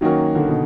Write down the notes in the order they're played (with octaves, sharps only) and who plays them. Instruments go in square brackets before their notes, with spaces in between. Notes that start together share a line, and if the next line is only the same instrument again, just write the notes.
[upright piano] D#3 [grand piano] F#3 A#3 C#4 F#4 A#4
[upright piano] D3
B2